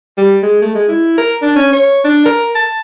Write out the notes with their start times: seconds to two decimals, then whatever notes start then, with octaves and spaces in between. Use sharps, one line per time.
0.18 G3
0.43 G#3
0.61 A3
0.75 G#3
0.88 E4
1.18 A#4
1.42 D4
1.56 C#4
1.72 C#5
2.04 D4
2.25 A#4
2.55 A5